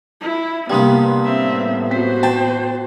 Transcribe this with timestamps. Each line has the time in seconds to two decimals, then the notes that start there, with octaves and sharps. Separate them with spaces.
0.21 E4
0.70 G2 C3 G3 A#3 B3 C6 D#6
1.24 A2 B3 C4 E5
1.90 C4 F#4 C5 B6
2.23 G5 A5